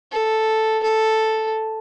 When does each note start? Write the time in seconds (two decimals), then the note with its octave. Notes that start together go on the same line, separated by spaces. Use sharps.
0.12 A4
0.83 A4